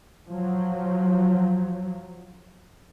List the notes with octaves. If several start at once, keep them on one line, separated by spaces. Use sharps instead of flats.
F3 F#3